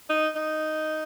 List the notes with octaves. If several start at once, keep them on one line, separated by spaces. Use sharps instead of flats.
D#4
D#4